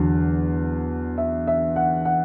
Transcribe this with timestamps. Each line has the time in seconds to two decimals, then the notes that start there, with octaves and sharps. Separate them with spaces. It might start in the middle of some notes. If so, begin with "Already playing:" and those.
Already playing: E2 D3 F#3
1.18 E5
1.47 E5
1.76 F#5
2.05 F#5